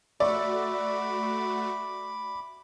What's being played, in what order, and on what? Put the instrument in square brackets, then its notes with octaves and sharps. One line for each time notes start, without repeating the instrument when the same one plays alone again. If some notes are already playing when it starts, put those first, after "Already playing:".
[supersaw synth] A3 F#4 [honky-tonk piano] D5 [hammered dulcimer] E5 C#6 [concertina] B5 D6